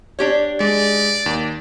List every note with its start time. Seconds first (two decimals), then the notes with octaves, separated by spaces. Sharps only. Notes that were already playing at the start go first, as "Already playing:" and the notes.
0.19 D4 G4 C#5
0.60 G#3 D5
1.26 D#2